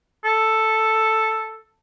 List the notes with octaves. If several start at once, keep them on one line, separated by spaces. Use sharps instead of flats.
A4